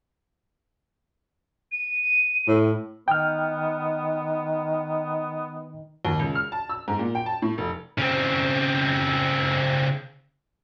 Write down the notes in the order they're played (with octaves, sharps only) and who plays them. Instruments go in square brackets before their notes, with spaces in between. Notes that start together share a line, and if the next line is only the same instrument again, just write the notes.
[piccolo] D#7
[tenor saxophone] A2
[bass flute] D#3 [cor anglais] B3 [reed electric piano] G5 F6
[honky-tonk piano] D#2
C#2
F6
A5
E6
G#2
A#2
G5
A5
A2
F1
[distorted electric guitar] C#3 C4